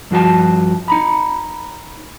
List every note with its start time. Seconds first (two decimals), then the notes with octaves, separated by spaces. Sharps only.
0.11 G2 F3 F#4 G4 A5
0.88 D#4 A#5 B5